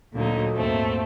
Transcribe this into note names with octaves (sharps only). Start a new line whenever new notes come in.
D2 A#2 D3 F#3 D#4
D#2 G#2 A3 C4